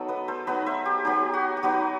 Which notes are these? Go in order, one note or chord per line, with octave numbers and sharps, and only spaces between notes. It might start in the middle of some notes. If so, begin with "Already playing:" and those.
Already playing: F#3 B3 D#4 A4
B4 D#5
A4 C5
F#3 B3 D#4 B4 D#5
C5 E5
G4
F#3 B3 D#4 G4
F#4
G4
F#3 B3 D#4 F#4